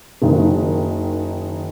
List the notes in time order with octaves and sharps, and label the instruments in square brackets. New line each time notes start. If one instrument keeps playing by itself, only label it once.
[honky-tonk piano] F#1 D#3